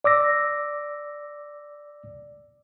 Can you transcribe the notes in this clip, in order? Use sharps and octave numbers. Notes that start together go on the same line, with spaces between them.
D5 D6 E6 A#6